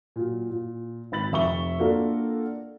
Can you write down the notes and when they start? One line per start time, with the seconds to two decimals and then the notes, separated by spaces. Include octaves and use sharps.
0.16 A#2 F#3
0.50 A#2
1.12 G#1 B5 A6 F#7
1.32 F1 E5 C#6 G7
1.79 A#3 D4 F4 F#4 A4 A#4